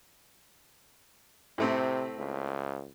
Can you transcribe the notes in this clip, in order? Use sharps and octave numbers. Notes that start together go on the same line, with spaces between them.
A2 C3 A3 C4
C#2